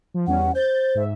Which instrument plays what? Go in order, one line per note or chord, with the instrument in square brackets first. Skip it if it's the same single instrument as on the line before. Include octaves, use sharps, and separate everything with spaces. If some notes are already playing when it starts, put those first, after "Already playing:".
[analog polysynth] F3
[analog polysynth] E2 G3 C#4 [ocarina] F#5
[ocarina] C5 [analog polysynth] G6 A6
[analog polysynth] G#2 E5